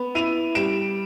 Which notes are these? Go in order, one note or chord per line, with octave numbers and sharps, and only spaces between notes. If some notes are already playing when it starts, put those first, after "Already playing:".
Already playing: B3
E4 D#7 F7
G3 D7 E7